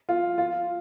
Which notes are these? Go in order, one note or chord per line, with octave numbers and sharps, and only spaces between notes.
F4
F4